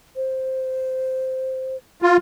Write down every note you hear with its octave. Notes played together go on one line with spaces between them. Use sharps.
C5
F4